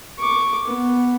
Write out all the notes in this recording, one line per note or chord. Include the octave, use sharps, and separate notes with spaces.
C#6 D6
B3